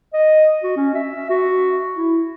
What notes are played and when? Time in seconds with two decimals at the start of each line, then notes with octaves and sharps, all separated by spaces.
0.13 D#5
0.63 F#4
0.76 C#4
0.95 E5
1.30 F#4
1.96 E4